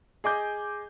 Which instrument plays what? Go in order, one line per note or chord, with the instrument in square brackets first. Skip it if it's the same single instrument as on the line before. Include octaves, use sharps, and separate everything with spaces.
[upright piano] G#4 D#5 D6 G6